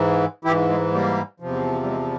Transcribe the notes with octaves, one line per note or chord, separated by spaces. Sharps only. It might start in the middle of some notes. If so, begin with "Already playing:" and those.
Already playing: G#2 E3
G#2 E3 E4 G4
G#3
G3 A#3
E2 C3 F3
G3
G#3